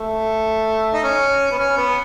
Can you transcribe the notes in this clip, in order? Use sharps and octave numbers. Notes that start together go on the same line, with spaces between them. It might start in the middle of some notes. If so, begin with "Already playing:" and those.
Already playing: A3
D#4
C#4
B3
C#4
B3